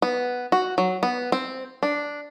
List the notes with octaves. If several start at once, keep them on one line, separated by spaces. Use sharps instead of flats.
B3
F#4
F#3
B3
C4
D4